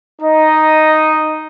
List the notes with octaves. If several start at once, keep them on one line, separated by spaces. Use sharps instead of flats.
D#4 D#5